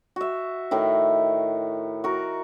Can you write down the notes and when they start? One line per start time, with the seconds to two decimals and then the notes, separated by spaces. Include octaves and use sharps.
0.16 F#4 E5
0.71 A2 D#3 E4
2.04 F#4 A#4